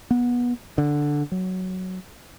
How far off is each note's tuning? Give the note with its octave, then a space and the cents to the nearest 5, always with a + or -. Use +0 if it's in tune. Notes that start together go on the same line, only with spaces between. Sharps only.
B3 -20
D3 +0
F#3 +5